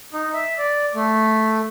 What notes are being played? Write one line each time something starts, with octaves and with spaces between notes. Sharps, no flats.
D#4
E5
D5
A3